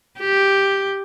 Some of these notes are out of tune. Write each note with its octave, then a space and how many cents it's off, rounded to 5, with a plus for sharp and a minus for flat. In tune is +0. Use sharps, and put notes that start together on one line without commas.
G4 +0